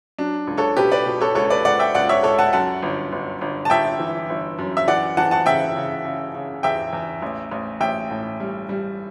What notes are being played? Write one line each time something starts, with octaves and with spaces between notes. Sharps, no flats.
F#3 D4
C#2
A4 C#5
B2 G4 B4
B4 D5
B2
A4 C#5
C#2 A4 C#5
B4 D5
C#2 D5 F#5
E5 G5
C#2 D5 F#5
C#5 E5
C#2 A4 C#5
F#5 A5
F#2 F#5 A5
G1
G1
G1
A5
G1 E5 G5
E3
G1
F#2
E5
E3 D5 F#5
E3 F#5 A5
F#5 A5
C#3 E5 G5
C#3
C#3
C#3
E2 E5 G5
E2
A1
A1
A1 E5 G5
A2
G3
G3